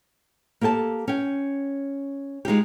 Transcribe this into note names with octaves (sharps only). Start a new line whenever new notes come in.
A#3 G4 A4 G5 A5
C#4 G5
G#3 D#4 F4 G4